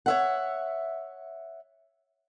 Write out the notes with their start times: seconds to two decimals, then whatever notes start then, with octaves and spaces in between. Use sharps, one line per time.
0.06 C#5 E5 F#5